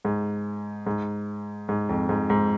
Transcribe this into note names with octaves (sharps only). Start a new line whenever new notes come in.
G#2
G#2
G#2
F2
G#2
G#2